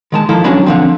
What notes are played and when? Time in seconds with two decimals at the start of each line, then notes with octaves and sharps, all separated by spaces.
0.12 D#3 G#3 A5
0.29 D#3 F3 E4 A4
0.44 F#3 C#4 D4 E4 D5 B5
0.66 D3 F3 C4